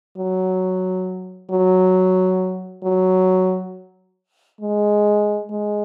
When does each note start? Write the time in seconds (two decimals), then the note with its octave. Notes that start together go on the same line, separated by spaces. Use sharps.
0.17 F#3
1.50 F#3
2.83 F#3
4.61 G#3
5.50 G#3